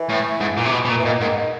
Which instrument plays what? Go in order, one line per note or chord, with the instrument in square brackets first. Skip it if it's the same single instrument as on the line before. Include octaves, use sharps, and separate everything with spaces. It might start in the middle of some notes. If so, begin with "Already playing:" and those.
Already playing: [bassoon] E3
[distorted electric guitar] A2
G#2
A#2
C3
B2
B2
A#2
[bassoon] E3
[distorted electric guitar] A#2 [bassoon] D#3
[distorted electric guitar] G#2 [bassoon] D#3
[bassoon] D#3